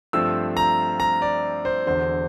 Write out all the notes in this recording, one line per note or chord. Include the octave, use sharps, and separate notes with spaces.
G2 F3 A3 C4 E6
A#5
A#5
D5
C5
E1 E2 D3 C5